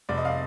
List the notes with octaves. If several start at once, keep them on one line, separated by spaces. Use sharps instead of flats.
F1 D5
D#5
F5